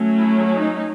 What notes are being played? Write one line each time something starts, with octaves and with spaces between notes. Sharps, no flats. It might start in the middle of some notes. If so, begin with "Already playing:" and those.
Already playing: F#3 A3 C#4
E4
D#4